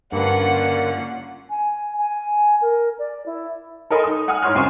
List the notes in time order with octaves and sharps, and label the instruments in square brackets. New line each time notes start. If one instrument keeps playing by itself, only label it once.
[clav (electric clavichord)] G2 B4 [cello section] D3 C#4 F4 [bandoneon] A#3 [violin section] F#5
[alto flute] G#5
G#5
A#4
D5
E4
[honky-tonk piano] A4 A#4 D#5 G#5 B5 C6
D#4 D#6
F#5 G#5 D#6 F6
G#2 E4 C#5 C6 F6
C#2 F#2 C4 G#5 C6 C#6